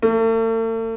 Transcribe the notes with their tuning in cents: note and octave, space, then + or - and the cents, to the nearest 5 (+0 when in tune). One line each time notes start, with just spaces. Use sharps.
A3 +45